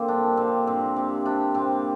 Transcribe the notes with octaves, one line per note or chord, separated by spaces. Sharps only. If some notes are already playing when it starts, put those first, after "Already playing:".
Already playing: D3 A#3 C4
G2 F3 D4
A#2 G3 C4
G2 F3 C4
C3 G3 C4
C3 G3 D4
A#2 G3 C4